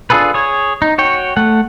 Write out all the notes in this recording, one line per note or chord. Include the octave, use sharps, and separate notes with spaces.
D4 F4 G#4 A4 B4
G#4 C#5
D#4
F#4 C#5 G5
A3 F#5